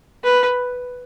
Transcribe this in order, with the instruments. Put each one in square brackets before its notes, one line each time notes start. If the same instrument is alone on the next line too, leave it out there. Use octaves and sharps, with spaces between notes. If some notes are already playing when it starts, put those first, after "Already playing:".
[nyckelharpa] B4